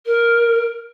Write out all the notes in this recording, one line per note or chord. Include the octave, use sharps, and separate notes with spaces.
A#4